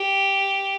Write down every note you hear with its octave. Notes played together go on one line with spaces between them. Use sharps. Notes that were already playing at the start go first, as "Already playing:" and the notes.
Already playing: G4